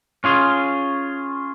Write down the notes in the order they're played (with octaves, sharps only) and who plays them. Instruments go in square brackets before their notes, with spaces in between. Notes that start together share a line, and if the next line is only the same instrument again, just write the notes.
[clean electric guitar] C#4 F4 G#4